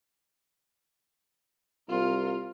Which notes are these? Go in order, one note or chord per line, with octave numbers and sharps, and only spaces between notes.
C2 F4 A#4